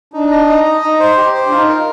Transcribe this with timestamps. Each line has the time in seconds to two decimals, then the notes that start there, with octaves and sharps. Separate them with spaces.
0.13 D4 D#4
0.31 D#5
0.48 D#4
0.65 D#5
0.82 D#4
1.00 C5
1.17 G4
1.34 C5
1.45 D4
1.51 D#4 F4
1.69 A#4